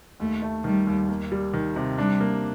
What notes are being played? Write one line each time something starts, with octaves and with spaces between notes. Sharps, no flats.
D#2 A3
A3
D#3 G3
D#2
A#3
G3
D#3
C3
G3 D4
A#3